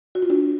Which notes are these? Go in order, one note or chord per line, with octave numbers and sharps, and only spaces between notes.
F#4
F4
D4 F#4